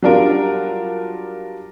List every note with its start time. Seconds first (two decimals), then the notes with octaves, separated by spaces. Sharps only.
0.02 F#3 G3 D4 F4 A#4